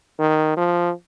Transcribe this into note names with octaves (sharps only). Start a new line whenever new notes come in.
D#3
F3